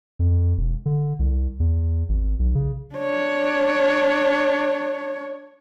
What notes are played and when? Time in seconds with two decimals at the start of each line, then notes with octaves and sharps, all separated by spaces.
0.19 F2
0.58 E1
0.86 D3
1.19 C2
1.60 E2
2.09 G#1
2.39 B1
2.55 C#3
2.95 D4 C#5